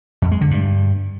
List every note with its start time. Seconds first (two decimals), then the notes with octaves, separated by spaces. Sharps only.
0.22 F2
0.32 G#3
0.41 D3
0.51 G2